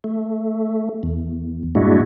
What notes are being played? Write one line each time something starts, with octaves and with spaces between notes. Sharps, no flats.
A3
E2
G2 A#2 G#3 D4 E4 F#4